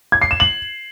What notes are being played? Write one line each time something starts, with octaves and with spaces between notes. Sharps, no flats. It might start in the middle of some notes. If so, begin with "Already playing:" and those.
G#6
C7
E7
F#7